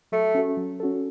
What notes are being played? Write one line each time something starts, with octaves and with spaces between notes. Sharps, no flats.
F#3 A3
C#4 F#4 A4
F#3
C#4 F#4 A4